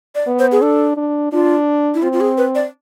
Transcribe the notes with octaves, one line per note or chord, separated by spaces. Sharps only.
D5
B3
C5
G#4
D4 A4
D4
D4 F4
E4
C4 F4
F4
G#4
B4
D5